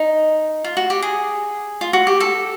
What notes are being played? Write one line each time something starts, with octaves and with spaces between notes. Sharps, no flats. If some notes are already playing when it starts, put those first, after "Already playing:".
Already playing: D#4
F4
F#4
G4
G#4
F4
F#4
G4
A4